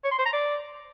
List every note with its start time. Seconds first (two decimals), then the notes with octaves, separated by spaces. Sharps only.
0.04 C#5
0.11 C6
0.18 C5
0.26 A#5
0.33 D5